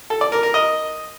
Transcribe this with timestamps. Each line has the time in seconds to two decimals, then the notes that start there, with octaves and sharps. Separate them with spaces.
0.10 A4
0.21 D5
0.32 A#4
0.43 A#4
0.54 D#5